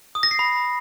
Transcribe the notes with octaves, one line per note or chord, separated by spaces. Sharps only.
D#6
A#6
C7
B5